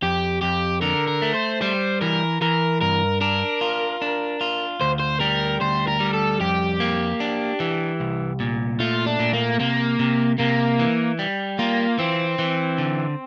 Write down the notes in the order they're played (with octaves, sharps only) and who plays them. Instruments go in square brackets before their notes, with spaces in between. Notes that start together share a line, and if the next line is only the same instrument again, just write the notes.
[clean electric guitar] F2 [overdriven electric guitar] G4
[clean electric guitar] F2 [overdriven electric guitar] G4
[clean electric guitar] D3 [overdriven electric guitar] A#4
[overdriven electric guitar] A#4
[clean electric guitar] A3
[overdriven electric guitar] C5
[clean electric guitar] G3 [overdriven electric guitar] C5
[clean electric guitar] E3 [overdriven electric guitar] A#4
[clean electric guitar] E3 [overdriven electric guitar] A#4
[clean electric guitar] G2 [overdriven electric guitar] A#4
[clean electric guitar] D4 [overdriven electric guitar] A#4
[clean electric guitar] F4
D4
F4
[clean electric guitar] D2 [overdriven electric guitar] C5
[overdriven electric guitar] C5
[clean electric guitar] G3 [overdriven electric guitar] A#4
[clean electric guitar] D2 [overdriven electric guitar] C5
[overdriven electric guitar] A#4
[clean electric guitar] G3
[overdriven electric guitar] A4
[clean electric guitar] F2 [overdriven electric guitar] G4
[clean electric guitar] A#3
D4
E3
C2
A#2
[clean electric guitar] A3 [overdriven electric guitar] F4
[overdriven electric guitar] D4
[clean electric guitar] A#2
[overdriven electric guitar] A#3
[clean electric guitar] C3 [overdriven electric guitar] A#3
[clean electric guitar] C3
[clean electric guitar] C3 [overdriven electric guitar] A#3
[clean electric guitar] E3
G3
[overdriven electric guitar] A#3 [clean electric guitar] F4
[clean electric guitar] E3 [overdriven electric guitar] C4
[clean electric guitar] E3
D3